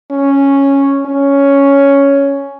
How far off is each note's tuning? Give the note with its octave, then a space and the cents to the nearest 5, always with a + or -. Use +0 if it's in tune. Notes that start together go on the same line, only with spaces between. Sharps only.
C#4 -5
C#4 +5